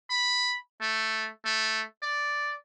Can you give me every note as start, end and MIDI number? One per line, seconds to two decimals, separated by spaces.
0.10 0.57 83
0.81 1.30 57
1.45 1.83 57
2.03 2.55 74